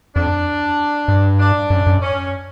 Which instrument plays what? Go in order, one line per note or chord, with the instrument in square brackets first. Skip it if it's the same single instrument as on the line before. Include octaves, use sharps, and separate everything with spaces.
[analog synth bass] F2 [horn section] D4
[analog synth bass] G2
[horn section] D4
[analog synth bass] F#2
F#2
[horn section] C#4